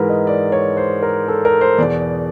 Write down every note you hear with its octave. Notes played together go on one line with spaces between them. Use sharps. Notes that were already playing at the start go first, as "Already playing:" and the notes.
Already playing: G#2 E3 A#4 B4
D#5
D5
C#5
C5
A#4
A4
A#4
C5
E2 B2 D5